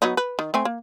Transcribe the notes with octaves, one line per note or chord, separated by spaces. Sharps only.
F#3 B3 D#4
B4
D#3
A3 C4 G#5
A#3